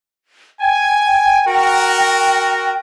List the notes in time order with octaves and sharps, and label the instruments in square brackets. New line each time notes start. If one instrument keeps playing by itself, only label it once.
[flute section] G5 [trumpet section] G#5
[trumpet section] F#4 A#4